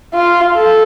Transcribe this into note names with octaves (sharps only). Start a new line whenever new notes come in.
F4
A4